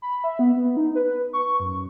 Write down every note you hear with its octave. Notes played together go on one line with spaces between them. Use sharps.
B5
E5
B3
B3
D#4
B4
C#6
F#2